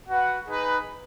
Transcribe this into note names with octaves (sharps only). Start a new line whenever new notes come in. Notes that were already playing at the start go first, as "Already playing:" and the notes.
F#4 B4 F#5
D#4 G#4 B4